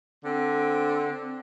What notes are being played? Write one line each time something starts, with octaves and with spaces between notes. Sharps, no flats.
D3 C4